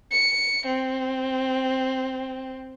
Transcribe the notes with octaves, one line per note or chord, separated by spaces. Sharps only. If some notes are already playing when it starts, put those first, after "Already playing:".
C#7
C4